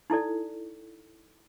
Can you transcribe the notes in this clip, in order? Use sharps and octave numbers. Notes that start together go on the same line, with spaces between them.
D#4 E4 A4 D5